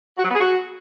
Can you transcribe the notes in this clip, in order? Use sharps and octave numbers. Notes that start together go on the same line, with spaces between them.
F#4
F#3
B3
G#4
F#4